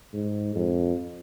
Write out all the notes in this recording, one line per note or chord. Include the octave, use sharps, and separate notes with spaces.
G#2
F2